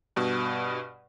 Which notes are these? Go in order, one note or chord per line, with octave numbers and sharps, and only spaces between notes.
G2 B2